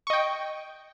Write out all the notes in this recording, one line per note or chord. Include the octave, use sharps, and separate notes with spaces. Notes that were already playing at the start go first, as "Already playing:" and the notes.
D#5 G5 C#6